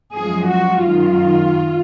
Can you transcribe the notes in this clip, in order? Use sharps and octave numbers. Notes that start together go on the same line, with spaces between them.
F#2 F3 G#3 G#4
F#4
F#2 D#3 G#3 F4